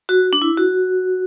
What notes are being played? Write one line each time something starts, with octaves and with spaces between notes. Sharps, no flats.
F#4
D4
E4
F#4